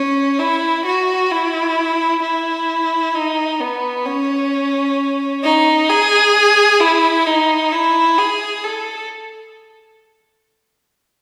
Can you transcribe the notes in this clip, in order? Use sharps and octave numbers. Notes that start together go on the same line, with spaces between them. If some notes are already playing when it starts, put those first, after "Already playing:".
Already playing: C#4
E4
F#4
E4
E4
D#4
B3
C#4
D#4
G#4
E4
D#4
E4
G#4
A4